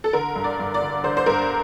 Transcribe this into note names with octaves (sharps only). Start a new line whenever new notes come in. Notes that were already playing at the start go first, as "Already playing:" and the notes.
A4
D3 A#4
G2
D5
G2
D5
D3
D3 C5
C5
G2 A#4